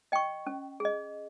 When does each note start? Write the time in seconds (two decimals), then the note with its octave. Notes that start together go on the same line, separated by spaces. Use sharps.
0.12 D#5 G5 C#6
0.47 C#4
0.80 G#4 D#5